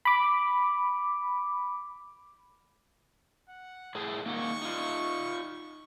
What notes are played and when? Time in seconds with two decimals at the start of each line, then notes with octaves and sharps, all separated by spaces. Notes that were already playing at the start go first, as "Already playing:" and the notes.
0.05 B5 D6
3.49 F#5
3.95 A2 A3 G#4
4.26 A#3 D#4 F#5 C#6
4.62 D#4 F4